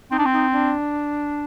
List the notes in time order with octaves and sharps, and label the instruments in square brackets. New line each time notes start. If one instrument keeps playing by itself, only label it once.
[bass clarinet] C4 [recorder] D#4
[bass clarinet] D4
C4
[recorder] D#4
D4